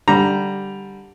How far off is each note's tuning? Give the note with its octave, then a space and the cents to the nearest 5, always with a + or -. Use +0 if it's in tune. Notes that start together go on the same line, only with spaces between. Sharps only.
D3 +0 G3 +0 A#5 +0